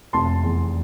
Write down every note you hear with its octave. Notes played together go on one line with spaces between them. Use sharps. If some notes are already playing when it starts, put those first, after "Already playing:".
F1 A5 C6
E2